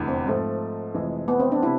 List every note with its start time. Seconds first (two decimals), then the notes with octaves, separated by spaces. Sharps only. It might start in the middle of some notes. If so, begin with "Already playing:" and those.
Already playing: F1 E2 D3
0.08 C4
0.26 G#2 F3 A3
0.94 F1 F2 E3 G#3
1.28 B3
1.40 C4
1.52 D4
1.63 C3 E4